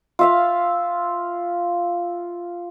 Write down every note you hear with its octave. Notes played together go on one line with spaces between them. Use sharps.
F4 E5 F5